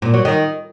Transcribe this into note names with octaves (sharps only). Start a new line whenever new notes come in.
A#2
F#3
D#3